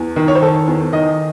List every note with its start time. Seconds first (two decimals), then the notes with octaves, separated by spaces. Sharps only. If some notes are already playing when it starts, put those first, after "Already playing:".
Already playing: E2
0.16 D#3
0.28 C#5
0.35 C5
0.42 D#3 A4
0.67 E2
0.92 D#3 D#5